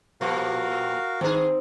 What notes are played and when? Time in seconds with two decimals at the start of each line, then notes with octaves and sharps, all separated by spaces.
0.21 A#2 F3 G3 F#4 A#4 F5
1.21 D#3 C4 D#4 G#4